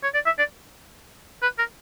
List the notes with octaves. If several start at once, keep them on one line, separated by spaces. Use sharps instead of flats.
C#5
D5
E5
D5
B4
A#4